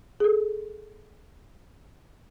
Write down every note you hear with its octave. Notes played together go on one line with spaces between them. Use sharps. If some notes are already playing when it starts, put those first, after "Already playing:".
G#4 A4